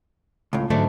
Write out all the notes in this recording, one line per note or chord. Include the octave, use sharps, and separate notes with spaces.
C#2 A2
G#2 D3 F#3 A3 D4